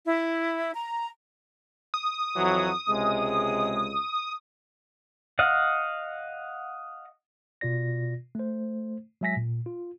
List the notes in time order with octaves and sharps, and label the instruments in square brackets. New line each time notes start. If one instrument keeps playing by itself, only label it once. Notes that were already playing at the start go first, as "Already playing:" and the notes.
[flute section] E4
A#5
[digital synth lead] D#6
[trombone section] F2 E3 F#3
C#2 C3 G#3
[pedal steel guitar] D#5 F5 F#5
[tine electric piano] B2 F4 D5 A#6
A3 C5
F#3 G#3 E5 G#5 A#6 B6
A#2
F4